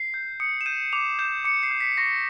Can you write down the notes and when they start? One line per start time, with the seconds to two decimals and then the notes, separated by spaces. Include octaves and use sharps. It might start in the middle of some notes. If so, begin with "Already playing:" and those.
Already playing: C7
0.14 G6
0.40 D#6 C#7
0.61 E7
0.66 G6 D#7
0.93 D6 F7
1.19 G6 E7
1.45 D6 C#7
1.63 C7
1.71 G6
1.81 B6
1.98 C#6 A#6